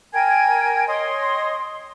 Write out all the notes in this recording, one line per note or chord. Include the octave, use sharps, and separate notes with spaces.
A#4 G5 G#5 G#6
C#5 D#5 C6 D#6